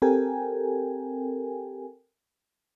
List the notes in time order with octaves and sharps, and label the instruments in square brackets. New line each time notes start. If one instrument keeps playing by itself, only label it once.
[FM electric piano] C4 G4 A4 A#4 G5 G#5